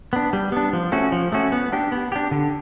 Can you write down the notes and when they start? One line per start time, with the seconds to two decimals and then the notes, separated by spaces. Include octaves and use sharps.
0.13 B3 D4
0.33 G3
0.52 B3 D4
0.73 F3
0.92 A3 C#4 F#4
1.12 F3
1.32 A3 C#4 F#4
1.52 B3
1.72 D4 G4
1.92 B3
2.12 D4 G4
2.31 D3